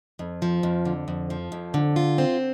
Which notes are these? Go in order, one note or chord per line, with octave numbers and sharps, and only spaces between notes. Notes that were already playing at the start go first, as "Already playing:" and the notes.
F2
F3
F2
D3
F2
F3
F2
D3
F4
C4